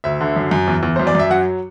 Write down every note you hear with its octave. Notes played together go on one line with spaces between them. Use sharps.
D2 E5
D3
F#2
F#2
E2
E2
F#2 C5
D5
F#2 E5
F#3 F#5